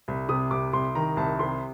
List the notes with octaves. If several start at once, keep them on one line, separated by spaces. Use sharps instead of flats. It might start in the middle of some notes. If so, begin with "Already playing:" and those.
C2
C3 D#6
C2 D6
C2 C6
D#3 A#5
C2 A5
C3 C6